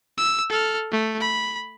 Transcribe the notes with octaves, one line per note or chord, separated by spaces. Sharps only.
E6
A4 F6
A3
B5